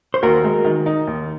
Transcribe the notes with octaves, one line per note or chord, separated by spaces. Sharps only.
C5
D#2 F#4 A#4
G#3
D#3
D#4
D#2